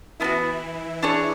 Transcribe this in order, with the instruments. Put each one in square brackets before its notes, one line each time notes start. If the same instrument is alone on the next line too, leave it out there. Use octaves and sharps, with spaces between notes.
[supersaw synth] E3 E4 [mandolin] B3 D4
[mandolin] F#4
D4 G#4 C#5